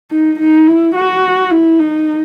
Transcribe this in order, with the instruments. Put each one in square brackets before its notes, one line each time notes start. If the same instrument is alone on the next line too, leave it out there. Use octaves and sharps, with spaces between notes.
[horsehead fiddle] D#4
D#4
E4
F#4
E4
D#4